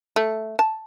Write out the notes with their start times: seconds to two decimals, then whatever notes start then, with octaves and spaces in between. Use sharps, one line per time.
0.16 A3
0.59 A5